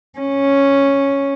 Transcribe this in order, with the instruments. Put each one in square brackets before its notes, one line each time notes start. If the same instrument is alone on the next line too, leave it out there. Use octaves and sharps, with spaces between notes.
[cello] C#4